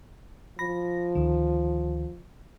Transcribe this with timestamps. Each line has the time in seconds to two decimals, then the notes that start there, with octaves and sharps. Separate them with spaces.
0.59 F3 B5 A#6
1.15 D2 D#3